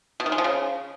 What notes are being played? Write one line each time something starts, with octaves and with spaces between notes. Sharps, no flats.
B2
D#3
G#3
F3
C#3